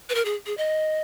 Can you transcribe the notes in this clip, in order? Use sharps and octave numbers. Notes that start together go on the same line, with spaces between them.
B4
A#4
G#4
G#4
D#5